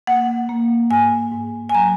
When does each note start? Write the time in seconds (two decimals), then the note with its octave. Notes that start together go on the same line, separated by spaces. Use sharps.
0.07 A#3 F#5
0.49 A#3
0.90 G#2 G#5
1.32 G#2
1.69 G#5
1.74 F#3 A#5